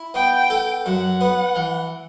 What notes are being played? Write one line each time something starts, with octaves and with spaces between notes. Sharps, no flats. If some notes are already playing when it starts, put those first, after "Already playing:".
Already playing: E4
B3 G5
A4
F#2 F#5
B3
E3